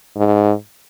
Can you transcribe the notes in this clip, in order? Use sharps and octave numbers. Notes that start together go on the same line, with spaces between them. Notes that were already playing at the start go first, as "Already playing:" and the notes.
G#2